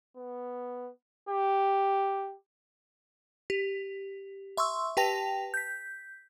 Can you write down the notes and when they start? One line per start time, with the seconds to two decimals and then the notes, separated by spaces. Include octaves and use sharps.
0.17 B3
1.29 G4
3.50 G4
4.57 E5 C6 C#6 E6
4.97 G4 B4 G5 A5 A#6 F7
5.54 G6 B6